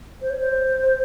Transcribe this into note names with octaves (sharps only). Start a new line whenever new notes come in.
C5
C#5
C5